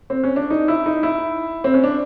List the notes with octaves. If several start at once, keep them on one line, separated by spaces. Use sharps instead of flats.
C4
C#4
D4
D#4
E4
D#4
E4
C4
C#4
D4